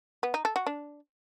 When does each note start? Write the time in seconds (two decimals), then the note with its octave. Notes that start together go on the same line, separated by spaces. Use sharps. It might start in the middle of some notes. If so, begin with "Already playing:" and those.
0.23 B3
0.34 D#4
0.45 A4
0.56 F#4
0.67 D4